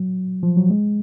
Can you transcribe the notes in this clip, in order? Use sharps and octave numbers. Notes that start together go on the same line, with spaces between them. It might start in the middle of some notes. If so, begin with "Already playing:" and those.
Already playing: F#3
F3
F#3
G#3